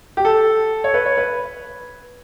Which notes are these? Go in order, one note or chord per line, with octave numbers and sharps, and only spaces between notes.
G4
A4
C#5
B4
C#5
B4